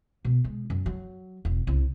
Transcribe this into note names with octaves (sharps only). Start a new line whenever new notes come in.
B2
G#3
F#2
F#3
E1
C2